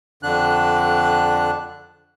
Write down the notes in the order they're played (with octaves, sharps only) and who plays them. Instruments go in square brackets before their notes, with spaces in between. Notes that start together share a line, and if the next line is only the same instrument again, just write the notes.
[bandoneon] F2 D3 D4 F#6